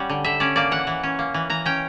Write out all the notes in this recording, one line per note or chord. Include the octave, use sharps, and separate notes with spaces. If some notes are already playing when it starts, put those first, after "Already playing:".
Already playing: G3 C#4 F#5
D3
D3 E5
C#4 D5
A#3 D5
E3 F#5
E3
C#4
A#3
E3
E3 A#5
C#4 G5